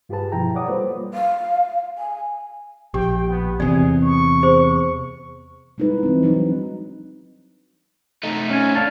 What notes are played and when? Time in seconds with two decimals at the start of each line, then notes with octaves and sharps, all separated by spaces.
0.09 G2 F4 G4 G#4 B4 A5
0.32 G2 B2 F3 E4 G5 A#5
0.55 C#5 D5 F#5 D6 D#6
0.68 G3 A#3 F4 A4 B4 C5
1.14 F5
1.98 G#5
2.94 A#1 G4 G5
3.28 B3
3.60 E2 C3 G#4 D5
4.02 C#6
4.43 G#4 C5
5.78 G3 G#3 D#4 E4 B4
6.03 E3 C4
6.23 F#3 D4 D#4
8.23 A3 D#4
8.50 C#4 G#5
8.75 D4 F5 A5